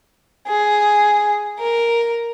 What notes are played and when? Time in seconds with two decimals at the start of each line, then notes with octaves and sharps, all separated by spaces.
0.47 G#4
1.59 A#4